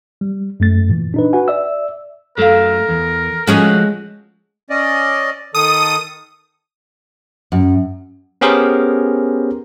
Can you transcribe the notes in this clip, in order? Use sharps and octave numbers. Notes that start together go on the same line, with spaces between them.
G3
F#2 A3 A6
A#2 E3
D4 D#4 B4
F#4 B4 F#5 G#5
D5 E5 E6
F#2 F#3 A3 A4 A#4 F5
E2
F3 G#3 A3 C#4 F#4 G#4
C#4 D5 D#5
D#3 A4 D#6
F#2
B3 C#4 G4 G#4 A#4 C5